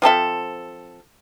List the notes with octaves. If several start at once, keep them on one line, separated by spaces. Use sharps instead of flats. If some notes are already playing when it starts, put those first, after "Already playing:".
F3 C4 A4 E5